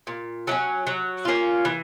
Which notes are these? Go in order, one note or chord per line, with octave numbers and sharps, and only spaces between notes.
A#2
F#3 A3 C#4
F#3
A#3 C#4 F4
E3